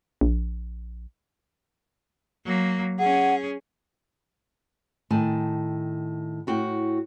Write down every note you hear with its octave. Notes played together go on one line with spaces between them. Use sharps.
A#1
F#3 A#3
C#4 G#4 F#5
A2 D#3 G#5 A5
A2 F#4 G5